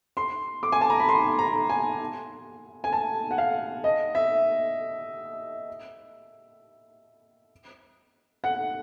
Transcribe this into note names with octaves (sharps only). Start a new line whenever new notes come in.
C6
D6
G#5
A5
A#5
B5
C6
A#5
G#5
G#5
A5
F#5
F5
D#5
E5
F#5